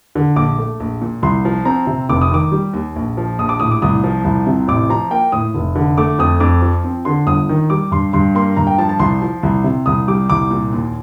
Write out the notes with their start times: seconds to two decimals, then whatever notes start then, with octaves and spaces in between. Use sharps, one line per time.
0.15 D3
0.36 A#1 D6
0.59 A3
0.80 A#1
1.02 A#2
1.22 C2 C6
1.45 F3
1.65 C4 A#5
1.87 C3
2.09 F1 D6
2.22 D#6
2.31 D#3 D6
2.52 G3
2.73 D#2
2.96 A#1
3.17 F3
3.39 A#1 D#6
3.49 D6
3.60 A2 D#6
3.71 D6
3.82 C2 D#6
4.04 F3
4.24 C2
4.47 C3
4.68 A1 D6
4.89 F3 A#5
5.11 A#3 G5
5.32 A2 D#6
5.55 F1
5.75 D3
5.98 A3 D6
6.19 F2 D#6
6.40 F2 D6
6.62 F3
6.84 C4
7.05 D3 C6
7.27 G1 D#6
7.49 D#3
7.70 G3 D6
7.91 G2 C6
8.13 G2 C6
8.35 A#3 C6
8.57 G2 A#5
8.67 G5
8.78 F3 A5
8.89 A5
8.99 C2 C6
9.22 F3
9.43 C2
9.64 C3
9.86 C2 D#6
10.08 G3 D6
10.30 C2 D6
10.51 A#2
10.72 D#2